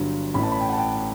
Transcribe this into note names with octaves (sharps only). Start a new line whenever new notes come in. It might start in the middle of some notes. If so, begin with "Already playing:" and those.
Already playing: G1 G2 F#3
A1 A2 E3 B5
A5
B5
G5
F#5
A5
G5